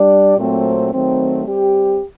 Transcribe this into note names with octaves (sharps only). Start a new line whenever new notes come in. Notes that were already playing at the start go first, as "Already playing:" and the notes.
Already playing: G3 D4 G4 D5
A#2 F#3 A3 C4
D#3 F#3 A3 C4
G3 C4 G4